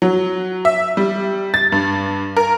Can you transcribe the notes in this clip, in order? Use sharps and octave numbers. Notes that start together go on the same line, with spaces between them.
F#3
E5
G3
A6
G2
A#4